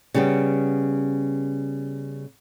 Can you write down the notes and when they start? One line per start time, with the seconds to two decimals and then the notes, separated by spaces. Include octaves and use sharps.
0.14 C#3 G3 B3